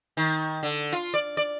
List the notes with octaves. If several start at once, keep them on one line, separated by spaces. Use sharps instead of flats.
D#3
D3
F4
D5
D5